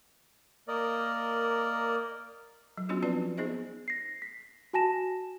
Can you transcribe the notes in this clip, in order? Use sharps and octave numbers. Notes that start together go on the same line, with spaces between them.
A#3 A#4 D5 D#5
F#3
F#3 B3 C#4 D4 F4 F#4
F3 C4 F4 B4 D5
B3 D#4 G#4 C5 D#5
A#6 C7
B6
F#4 G#5 A5 A#6 E7